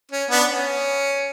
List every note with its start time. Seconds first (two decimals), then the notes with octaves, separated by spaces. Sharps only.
0.12 C#4
0.31 B3 D4
0.50 C#4